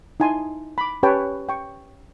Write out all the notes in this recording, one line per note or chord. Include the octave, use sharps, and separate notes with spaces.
D#4 E4 G#5 A5 C6
B5 D6
C#4 G4 B4 C#5 G5 A5
G5 C#6